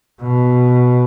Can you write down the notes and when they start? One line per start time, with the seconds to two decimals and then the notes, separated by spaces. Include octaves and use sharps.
0.22 B2